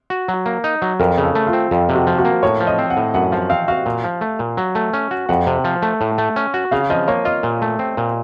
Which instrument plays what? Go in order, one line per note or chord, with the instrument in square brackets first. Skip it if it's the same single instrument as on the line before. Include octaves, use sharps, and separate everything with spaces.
[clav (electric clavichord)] F#4
F#3
A#3
D#4
F#3
[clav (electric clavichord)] F2 [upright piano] A#4
[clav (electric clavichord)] C#3
[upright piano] A4
[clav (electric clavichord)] A3
[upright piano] F4
[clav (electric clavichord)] C4
F2
C3
[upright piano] F#4
[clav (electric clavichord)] F3
[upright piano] F#4
[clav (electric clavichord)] A#3
[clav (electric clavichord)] A2 [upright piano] C#5
[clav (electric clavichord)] F3
[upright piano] D#5
[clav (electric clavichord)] C4
[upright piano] F#5
[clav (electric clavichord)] A2
[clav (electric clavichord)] F#2 [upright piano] F#5
[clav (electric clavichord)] F3 [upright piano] F5
[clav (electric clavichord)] C4 [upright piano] F5
[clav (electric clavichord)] F#4 [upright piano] F5
[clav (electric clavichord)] A#2
F3
A3
A#2
F#3
A3
C#4
F#4
[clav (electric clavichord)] F2 [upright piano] F#5
[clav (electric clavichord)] C3
F3
A3
A2
A3
C#4
F#4
[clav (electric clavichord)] C#3 [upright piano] F5
[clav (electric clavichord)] F3 [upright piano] D#5
[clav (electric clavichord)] A#3 [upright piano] C#5
[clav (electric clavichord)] F4 [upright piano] D#5
[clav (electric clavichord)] A#2
A3
C4
A#2